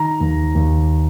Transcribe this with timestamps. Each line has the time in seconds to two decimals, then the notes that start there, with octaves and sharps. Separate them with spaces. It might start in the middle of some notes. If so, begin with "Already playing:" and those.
Already playing: D#3 A#5
0.20 D#2
0.55 D#2